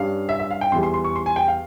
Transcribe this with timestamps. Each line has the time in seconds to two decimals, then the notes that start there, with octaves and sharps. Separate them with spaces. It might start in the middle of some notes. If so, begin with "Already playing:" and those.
Already playing: G2 G3 C#4 F5
0.29 E5
0.40 E5
0.51 F5
0.61 G5
0.72 E2 E3 G3 C6
0.83 C6
0.94 C6
1.04 C#6
1.16 C6
1.26 G#5
1.36 G5
1.48 F5